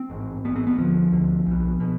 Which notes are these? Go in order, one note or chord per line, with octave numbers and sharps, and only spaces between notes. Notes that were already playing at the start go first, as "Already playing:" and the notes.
Already playing: C4
A1 G#2
A1 G#2 B3
C4
B3
D2 D3 F3
D2 D3
B1 B2
B2